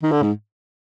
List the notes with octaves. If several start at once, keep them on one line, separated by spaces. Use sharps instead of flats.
D#3
D3
G#2